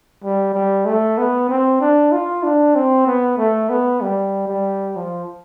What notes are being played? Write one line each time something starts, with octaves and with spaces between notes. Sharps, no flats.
G3
G3
A3
B3
C4
D4
F4
D4
C4
B3
A3
B3
G3
G3
F3